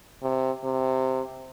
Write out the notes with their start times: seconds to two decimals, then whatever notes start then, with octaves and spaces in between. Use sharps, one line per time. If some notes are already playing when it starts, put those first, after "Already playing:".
0.22 C3
0.64 C3